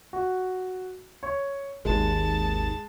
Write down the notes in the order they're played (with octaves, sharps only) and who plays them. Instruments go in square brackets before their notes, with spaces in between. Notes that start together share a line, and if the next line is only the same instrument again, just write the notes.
[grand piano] F#4
C#5 C#6
[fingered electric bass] G#1 D#2 [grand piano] G#3 [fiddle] A5